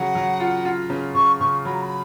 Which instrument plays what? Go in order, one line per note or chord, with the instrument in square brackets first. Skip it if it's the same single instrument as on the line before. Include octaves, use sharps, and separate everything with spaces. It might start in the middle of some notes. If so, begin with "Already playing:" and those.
Already playing: [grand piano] C#3 F#3 [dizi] F#5
[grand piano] F#3
F4
F4
C#3
[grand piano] C#3 [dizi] C#6
[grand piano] C#3 [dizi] C#6
[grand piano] F#3 [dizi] B5
[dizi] A#5
B5